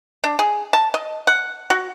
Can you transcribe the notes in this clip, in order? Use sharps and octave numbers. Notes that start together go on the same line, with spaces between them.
D4
G#4
A5
D#5
F#5
F#4